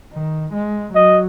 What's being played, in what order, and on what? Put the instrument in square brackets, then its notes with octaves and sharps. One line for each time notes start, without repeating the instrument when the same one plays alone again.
[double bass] D#3
G#3
[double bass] F#3 [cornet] D#5